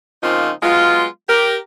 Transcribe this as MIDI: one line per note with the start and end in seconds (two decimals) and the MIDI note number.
0.22 0.50 49
0.22 0.50 53
0.22 0.50 58
0.22 0.50 60
0.22 0.50 63
0.22 0.50 65
0.62 1.06 54
0.62 1.06 56
0.62 1.06 59
0.62 1.06 65
1.29 1.56 67
1.29 1.56 70